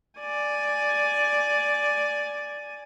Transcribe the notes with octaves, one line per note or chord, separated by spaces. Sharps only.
D5 G#5